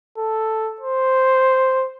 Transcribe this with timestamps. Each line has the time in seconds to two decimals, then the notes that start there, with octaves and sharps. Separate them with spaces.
0.18 A4
0.81 C5